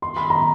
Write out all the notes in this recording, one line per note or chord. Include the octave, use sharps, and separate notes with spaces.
C6
B5
A#5